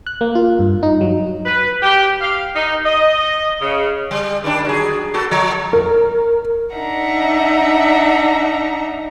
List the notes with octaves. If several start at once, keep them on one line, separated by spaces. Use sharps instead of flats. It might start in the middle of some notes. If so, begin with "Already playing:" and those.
F#6
A#3
F4
G2
D#4
F#3
B4
G4
F5
D#4
D#5
C#3
G3
D#3 G3 D4
F#3 G#4
A#3 F#4 A4
F3
A#4
D4 D#4 E5 F#5 A#5